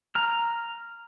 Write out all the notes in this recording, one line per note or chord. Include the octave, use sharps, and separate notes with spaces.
A#5 F6